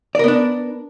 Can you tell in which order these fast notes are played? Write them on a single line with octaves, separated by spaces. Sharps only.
D5 A#4 B3 D4